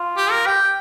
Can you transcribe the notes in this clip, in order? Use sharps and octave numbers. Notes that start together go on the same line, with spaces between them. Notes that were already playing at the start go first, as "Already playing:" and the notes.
Already playing: F4
G4
A#4
G4 G5